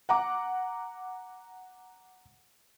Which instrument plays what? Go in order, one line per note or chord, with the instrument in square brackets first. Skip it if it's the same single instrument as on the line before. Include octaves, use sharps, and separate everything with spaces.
[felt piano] F#5 A#5 D6